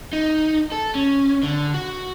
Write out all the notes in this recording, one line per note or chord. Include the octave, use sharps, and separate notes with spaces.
D#4
A4
C#4
D3
F#4